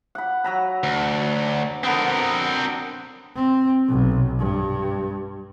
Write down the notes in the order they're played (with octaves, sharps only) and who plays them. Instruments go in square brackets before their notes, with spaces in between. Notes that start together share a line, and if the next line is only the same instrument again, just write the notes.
[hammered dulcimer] F#5 B5
F#3 A#5 B5
[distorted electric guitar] D2
[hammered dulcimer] D3 B3 [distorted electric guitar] C4 A#4
[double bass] C4
B1
G2